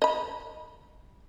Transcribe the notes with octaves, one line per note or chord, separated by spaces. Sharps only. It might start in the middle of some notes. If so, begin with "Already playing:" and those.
D#5 B5